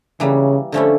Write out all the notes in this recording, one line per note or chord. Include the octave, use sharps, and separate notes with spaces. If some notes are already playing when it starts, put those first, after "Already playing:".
C#3 E3 G3 A#3
D3 F3 A3 C#4 E4